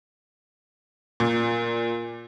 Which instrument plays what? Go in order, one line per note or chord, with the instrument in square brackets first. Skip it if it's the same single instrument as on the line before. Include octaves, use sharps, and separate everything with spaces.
[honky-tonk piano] A#2